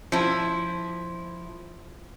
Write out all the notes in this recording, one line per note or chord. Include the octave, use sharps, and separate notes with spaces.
F3 E4